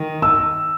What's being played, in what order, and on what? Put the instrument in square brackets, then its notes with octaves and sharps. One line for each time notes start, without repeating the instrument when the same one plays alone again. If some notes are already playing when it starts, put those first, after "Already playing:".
Already playing: [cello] D#3
[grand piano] E6